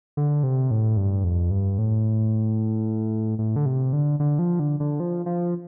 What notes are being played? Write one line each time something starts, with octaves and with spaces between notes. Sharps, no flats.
D3
C3
A2
G2
F2
G2
A2
A2
D3
C3
D3
D3
F3
D3
D3
F3
F3